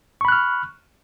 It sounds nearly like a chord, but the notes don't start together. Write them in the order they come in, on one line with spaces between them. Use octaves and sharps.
C#6 B5 F#6 F6